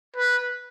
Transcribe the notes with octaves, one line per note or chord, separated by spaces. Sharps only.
B4